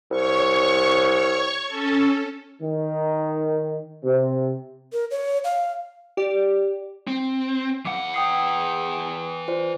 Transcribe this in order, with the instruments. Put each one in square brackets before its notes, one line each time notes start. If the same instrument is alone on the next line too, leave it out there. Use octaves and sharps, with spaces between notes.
[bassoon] C2 [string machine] C#5 C#6
[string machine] C#4 A4
[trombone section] D#3
C3
[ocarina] A#4
C#5
F5
[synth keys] G4 D5
[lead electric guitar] C4
[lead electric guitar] E3 F#5 [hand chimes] F5 D6
[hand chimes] G5 D#6 C7
F4 C5 D5